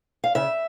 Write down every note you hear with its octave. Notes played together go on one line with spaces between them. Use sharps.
F5
C#3 E5